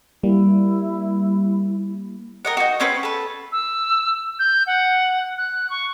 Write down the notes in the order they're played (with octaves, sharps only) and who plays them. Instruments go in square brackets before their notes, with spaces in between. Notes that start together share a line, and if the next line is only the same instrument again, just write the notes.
[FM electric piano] G3 A#3 [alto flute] E4
[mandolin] A#4 D#5 F#5
D#4 F#4
C4 C#4 B4
A4 B4
[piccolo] E6
G6
F#5
F#6
C#6